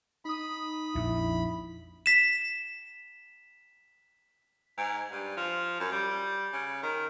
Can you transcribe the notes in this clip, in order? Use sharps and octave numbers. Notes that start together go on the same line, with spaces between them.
D#4 B5 D#6
A#1 F2 E4
B6 E7
G#2
G2
F3
F#2
G3
C#3
D#3